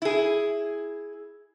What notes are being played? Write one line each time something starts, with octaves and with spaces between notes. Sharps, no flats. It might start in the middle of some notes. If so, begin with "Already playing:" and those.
E4 G#4